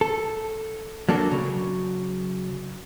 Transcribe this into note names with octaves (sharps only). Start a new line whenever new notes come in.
A4
F#3 A#3 D4 A4
C#3 F#3